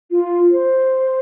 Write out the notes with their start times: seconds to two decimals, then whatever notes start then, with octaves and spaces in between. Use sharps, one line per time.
0.11 F4
0.51 C5